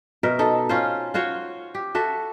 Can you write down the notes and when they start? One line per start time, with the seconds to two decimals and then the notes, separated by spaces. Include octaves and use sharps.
0.23 B2 A#4 E5
0.39 D#4 A4
0.69 C#4 F4 C5
1.14 F4 F#4 C5 C#5
1.75 G4
1.95 F#4 A4 E5